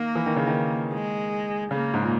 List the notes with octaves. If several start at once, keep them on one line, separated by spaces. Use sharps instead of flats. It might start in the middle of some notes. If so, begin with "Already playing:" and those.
Already playing: D#3 A#3
E3
D#3
C#3
D#3
G#3
C#3 A#3
G#2
A#2